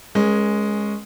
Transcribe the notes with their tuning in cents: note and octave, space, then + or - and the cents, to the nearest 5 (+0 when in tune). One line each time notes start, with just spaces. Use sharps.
G#3 +0 C#4 -10 A#4 +25